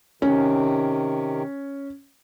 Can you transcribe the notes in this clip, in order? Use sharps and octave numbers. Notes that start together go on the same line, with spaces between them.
C3 D#3 C#4